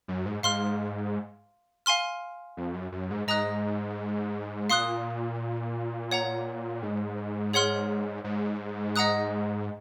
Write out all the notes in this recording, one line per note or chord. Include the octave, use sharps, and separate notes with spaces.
F#2
G#2
G#2 F5 C6 F6
F5 G#5 C6 F6
F2
F#2
F#2
G#2
G#2 D#5 A#5 D#6 F#6
A#2 F5 C6 D#6 F#6
C#5 F#5 A#5
G#2
G#4 C#5 F#5 C6 F6
G#2
D#5 F#5 A#5 D#6 F#6